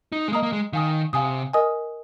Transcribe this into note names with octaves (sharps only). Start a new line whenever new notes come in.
D#4
G#3
A#3 D#5 A#5 D#6
A#3
G#3
D#3 F5 G#5 D#6
C3 F5 G#5 D#6
A#4 D#5 G#5 D#6